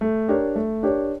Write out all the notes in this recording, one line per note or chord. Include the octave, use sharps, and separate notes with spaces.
A3
D4 G4 A#4 C#5
A3
D4 G4 A#4 C#5